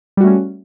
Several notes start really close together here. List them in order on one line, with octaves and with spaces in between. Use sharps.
G3 F#4 A3 C#4